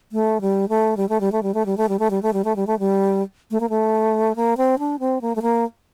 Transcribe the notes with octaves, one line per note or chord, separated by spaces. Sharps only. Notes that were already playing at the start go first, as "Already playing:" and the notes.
A3
G3
A3
G3
A3
G3
A3
G3
A3
G3
A3
G3
A3
G3
A3
G3
A3
G3
A3
G3
A3
A#3
A3
A#3
C4
D4
C4
A#3
A3
A#3